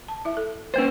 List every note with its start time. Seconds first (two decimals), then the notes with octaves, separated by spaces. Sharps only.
0.08 A5
0.25 E4 E5
0.37 A4
0.74 A#3 C#4 B4 C5